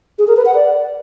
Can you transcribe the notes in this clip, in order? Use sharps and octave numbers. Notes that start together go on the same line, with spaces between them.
G#4
A#4
B4
F#5
D5